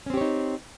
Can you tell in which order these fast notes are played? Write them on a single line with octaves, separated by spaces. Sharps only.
C#4 C4 G4 C#5 D#4